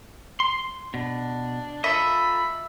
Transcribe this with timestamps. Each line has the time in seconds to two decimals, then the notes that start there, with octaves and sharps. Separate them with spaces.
0.40 C6
0.94 B2 D4
1.84 F4 A4 D#5 E5 B5